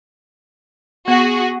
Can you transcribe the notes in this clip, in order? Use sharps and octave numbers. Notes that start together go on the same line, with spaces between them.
B3 F#4 G#4